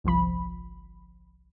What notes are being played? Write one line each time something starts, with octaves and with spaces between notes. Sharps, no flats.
G1 C2 F3 B5